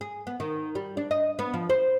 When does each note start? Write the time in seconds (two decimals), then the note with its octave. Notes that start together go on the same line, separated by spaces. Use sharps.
0.01 G#4
0.27 B3
0.40 D#3
0.75 G3
0.97 D4
1.11 D#5
1.39 B3
1.54 F3
1.70 C5